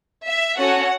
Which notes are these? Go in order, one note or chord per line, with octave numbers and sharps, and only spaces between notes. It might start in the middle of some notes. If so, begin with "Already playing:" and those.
E5
C#4 F#4 A4 F#5